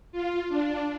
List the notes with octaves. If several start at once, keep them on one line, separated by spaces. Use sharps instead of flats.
F4
D4